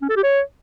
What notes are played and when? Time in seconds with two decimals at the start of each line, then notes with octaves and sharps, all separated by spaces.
0.02 C#4
0.09 A4
0.16 G4
0.24 C#5